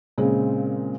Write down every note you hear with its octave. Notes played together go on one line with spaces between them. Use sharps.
A#2 C#3 G#3 C4